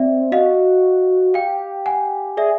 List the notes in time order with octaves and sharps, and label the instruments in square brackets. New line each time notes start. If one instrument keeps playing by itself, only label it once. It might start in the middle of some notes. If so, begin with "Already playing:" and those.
Already playing: [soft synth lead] C4 [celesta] D5 E5
[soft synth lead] F#4 [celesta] D#5 F5
[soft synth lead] G4 [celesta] F5 G5
[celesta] F#5 G#5
[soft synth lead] G#4 [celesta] D5 E5